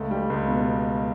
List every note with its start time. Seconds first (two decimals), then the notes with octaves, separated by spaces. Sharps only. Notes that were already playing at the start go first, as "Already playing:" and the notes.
Already playing: C#2 A3
0.11 G3
0.30 C#2
0.48 B2